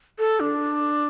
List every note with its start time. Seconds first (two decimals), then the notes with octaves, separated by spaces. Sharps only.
0.19 A4
0.40 D4